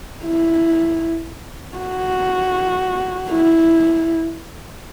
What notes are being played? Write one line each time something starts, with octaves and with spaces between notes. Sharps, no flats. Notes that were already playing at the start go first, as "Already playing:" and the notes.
E4
F#4
E4